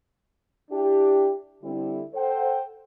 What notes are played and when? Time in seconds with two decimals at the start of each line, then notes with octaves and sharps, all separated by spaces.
0.71 D4 E4 G4
1.64 D3 G3 C4 E4
2.14 A4 C5 F#5 G5